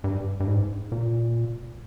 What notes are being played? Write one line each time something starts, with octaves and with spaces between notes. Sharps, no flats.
G2
G2
G#2
A#2